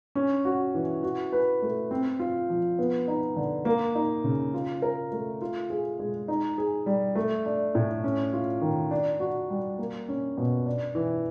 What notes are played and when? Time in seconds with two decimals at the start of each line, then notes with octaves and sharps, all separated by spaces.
0.15 C#4
0.45 F#4
0.75 E3
1.03 F#4
1.33 B4
1.62 A3
1.91 C4
2.20 F4
2.50 F3
2.79 B3
3.08 D#4
3.36 D3
3.65 A#3
3.95 D#4
4.24 C#3
4.54 F4
4.82 A#4
5.12 A3
5.42 F4
5.70 G#4
5.99 G#3
6.28 D#4
6.58 G#4
6.86 G3
7.15 A3
7.46 D4
7.75 A2
8.04 C#4
8.33 F4
8.61 D#3
8.91 D4
9.20 F#4
9.50 G3
9.78 A#3
10.09 C#4
10.37 B2
10.66 D4
10.95 E3